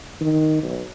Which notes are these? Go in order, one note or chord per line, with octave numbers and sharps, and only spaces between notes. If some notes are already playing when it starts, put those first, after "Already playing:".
D#3
B1